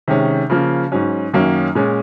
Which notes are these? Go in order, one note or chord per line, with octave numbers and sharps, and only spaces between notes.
C3 D#3 G#3 C#4
C#3 F3 A#3
G#2 F#3 C#4
F#2 D#3 F#3 A#3 C#4
A#2 G#3 C#4